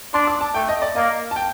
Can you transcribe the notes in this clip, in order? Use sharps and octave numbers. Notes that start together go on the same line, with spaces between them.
D4 C6
D6
A5
A3 G5
D#5
D5
A#3 D#5
A5
G5